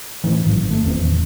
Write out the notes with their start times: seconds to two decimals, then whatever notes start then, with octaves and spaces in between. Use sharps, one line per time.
0.24 A2 D#3 E3 A3
0.45 A1 G#2 D#3 F#3
0.71 A3
0.82 E1 D#2 D#3 C4
0.97 D1 E2